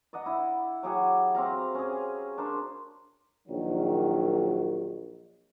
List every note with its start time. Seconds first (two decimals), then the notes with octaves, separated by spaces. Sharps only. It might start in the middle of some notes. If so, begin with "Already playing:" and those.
0.13 D5 D#5 F#5 A#5
0.26 E4
0.83 F#3 G4 G#4 F#5
1.35 C4 G4 F5 A#5
1.75 C#4 G#4
2.38 D4 A#4 C5
3.48 A#1 D#3 F#3